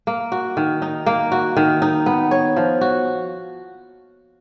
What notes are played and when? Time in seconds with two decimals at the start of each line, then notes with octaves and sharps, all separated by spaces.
0.07 A#3
0.32 F#4
0.57 D#3
0.82 D#4
1.06 A#3
1.32 F#4
1.57 D#3
1.82 D#4
2.06 B3
2.31 C#5
2.56 F3
2.81 F#4